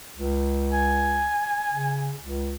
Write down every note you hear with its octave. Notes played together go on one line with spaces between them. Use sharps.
C#2
G#5
C#3
C#2